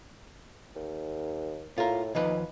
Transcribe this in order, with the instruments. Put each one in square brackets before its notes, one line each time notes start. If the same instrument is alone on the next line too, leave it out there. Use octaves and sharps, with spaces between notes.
[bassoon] D#2
[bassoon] A2 [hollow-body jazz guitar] F4 A#4
[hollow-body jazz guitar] D#2 F3 B4 [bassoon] D#4